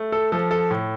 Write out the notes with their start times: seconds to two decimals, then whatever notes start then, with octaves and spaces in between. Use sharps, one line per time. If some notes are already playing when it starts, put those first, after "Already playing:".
Already playing: A3
0.12 A4
0.32 F3 A4
0.51 A4
0.70 A2